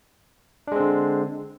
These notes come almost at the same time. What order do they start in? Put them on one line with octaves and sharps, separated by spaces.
D4 G#3 C4 D3